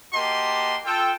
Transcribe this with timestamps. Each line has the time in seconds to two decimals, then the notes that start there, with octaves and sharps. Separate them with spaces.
0.13 A#3 F#4 G4 D#5 A5 C6
0.85 F4 A4 G5